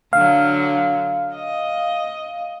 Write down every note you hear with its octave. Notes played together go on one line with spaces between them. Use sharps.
D3 F#3 F5
D#5